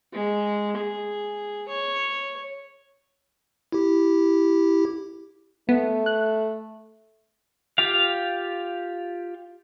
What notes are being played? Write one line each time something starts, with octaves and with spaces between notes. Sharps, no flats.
G#3
G#4
C#5
E4 G4
A3 B3
F#6
F4 G4 F5